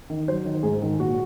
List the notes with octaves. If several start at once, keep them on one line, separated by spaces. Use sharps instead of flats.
D#3
F#3 C5
D#3
G#2 G#4
D#3
A#2 F#4